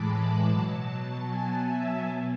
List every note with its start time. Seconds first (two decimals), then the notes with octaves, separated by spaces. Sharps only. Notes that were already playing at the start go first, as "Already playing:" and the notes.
Already playing: A2 E3 G#3 A5 B5 D6
0.49 B2 F#3
1.28 G#5
1.67 E5
2.06 B2